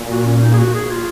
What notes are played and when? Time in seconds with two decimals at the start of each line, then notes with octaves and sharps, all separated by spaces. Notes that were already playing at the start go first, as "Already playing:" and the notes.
Already playing: A#2
0.09 F#4
0.25 C#4
0.42 D#4
0.53 G#4
0.58 F#4
0.74 G#4
0.91 F4